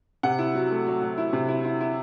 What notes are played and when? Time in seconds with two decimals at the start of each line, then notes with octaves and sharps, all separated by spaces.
0.23 C3 F#5
0.39 E4
0.55 F#3
0.71 A3
0.87 F#3
1.02 F#3
1.18 E4
1.33 C3
1.48 E4
1.65 E4
1.81 E4